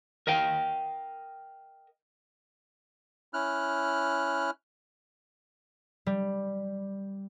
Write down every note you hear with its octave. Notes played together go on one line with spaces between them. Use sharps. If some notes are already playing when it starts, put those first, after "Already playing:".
A#4 D#5 F5 G5
C#4 E4 F6 F#6
G3